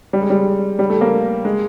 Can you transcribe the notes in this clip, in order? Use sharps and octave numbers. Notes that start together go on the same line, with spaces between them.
G3
G#3
G3
G3
A3
A#3
G#3